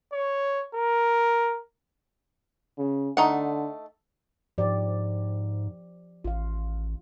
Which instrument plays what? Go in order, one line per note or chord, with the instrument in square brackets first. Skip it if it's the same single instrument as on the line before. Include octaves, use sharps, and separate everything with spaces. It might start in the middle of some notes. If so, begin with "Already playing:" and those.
[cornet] C#5
A#4
[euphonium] C#3
[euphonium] D3 [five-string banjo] A3 D#4 F#5
[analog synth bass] G#2 [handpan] F3 G4 D5
[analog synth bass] A1 [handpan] F4 F5